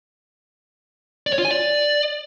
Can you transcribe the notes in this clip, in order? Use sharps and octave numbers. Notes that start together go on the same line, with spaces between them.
D5
C#5
F4
G#5
D5